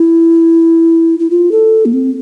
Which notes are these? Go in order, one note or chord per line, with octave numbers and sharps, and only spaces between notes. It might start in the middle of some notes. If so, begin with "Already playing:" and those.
Already playing: E4
E4
F4
A4
A#3
C4